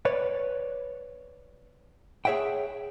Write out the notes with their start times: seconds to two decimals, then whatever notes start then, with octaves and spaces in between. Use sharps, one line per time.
0.05 B4 C#5 D5
2.25 G#4 C#5 E5 F#5 G5